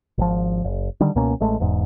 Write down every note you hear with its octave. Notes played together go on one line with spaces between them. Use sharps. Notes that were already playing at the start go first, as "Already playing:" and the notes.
G#1 F3
F#1
D3 D#3 G3
C#2 B2 A#3 C#4
A1 G#3 A3
E1 E2 G#2